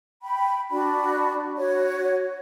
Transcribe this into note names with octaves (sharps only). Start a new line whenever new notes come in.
G5 B5
D4 F#4 D5 B5
F#4 C#5